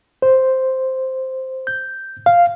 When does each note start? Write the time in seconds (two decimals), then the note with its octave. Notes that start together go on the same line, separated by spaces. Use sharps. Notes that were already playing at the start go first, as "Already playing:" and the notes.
0.22 C5
1.67 G6
2.26 F5